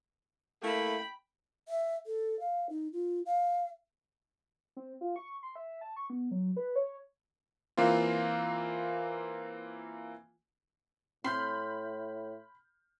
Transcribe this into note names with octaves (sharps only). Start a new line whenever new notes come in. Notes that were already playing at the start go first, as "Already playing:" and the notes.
A3 A#3 E4 G5 B5
E5
A4
F5
D#4
F4
F5
C4
F4
C#6
C6
E5
A5
C#6
B3
F#3
B4
C#5
E3 A#3 C4 F4
A2 C4 B5 C6 F6 G6